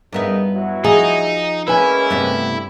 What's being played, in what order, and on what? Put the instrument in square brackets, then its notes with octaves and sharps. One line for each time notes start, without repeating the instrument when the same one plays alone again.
[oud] G2 B3 E5 [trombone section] C#3 D#4 A#4
[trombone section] F#3 E4 F#4
[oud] F3 [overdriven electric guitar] D#4 [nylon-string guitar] G#4
[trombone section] G#3 A#3 C#4 [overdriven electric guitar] E4 [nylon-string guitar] B4 G#5
[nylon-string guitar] G2 C4 [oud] C3 A3 B3